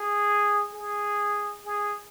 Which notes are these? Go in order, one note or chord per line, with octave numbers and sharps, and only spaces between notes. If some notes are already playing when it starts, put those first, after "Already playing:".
Already playing: G#4
G#4
G#4